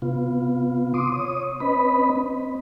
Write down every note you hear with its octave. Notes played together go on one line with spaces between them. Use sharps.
C3 B3 F4
C6 D6 D#6
C#5 D#6
C4 C#4 B4 D#5 B5
C4